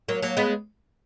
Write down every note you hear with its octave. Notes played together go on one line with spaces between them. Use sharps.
F#3 A#3
F#3 A#3
G#3 B3